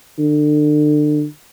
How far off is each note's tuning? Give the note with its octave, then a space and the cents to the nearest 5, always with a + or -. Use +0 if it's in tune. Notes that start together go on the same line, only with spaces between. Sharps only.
D3 +30